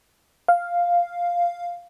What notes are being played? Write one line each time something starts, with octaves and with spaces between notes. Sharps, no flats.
F5